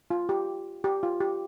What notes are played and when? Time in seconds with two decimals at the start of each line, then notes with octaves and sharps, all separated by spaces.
0.10 F4
0.29 G4
0.84 G4
1.03 F4
1.20 G4